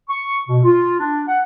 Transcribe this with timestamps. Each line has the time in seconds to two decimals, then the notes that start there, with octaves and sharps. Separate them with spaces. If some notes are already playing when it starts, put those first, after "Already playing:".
0.09 C#6
0.49 B2
0.64 F4
0.99 D4
1.28 F#5